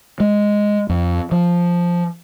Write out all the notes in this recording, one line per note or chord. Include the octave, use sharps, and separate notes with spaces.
G#3
F2
F3